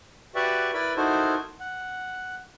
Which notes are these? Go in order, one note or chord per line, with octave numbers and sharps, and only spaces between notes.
F#4 G4 B4 D5 E5 F#5
E4 A#4 B4 D5 B5
D#4 E4 F#4 A4 A#4 C5
F#5